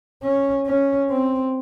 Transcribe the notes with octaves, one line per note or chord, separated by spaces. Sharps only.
C#4
C#4
C4